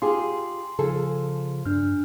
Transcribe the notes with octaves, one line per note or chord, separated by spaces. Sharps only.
F4 G4 G#4 C6
C#3 F3 G#4 A4
G2 D4 F6